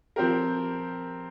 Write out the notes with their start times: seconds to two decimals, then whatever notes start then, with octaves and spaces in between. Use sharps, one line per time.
0.16 F3 C4 G4 A#4